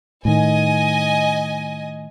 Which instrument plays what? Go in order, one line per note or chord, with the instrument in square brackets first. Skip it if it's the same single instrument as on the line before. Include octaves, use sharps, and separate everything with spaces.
[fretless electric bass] A2 D#3 [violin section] D#5 G#5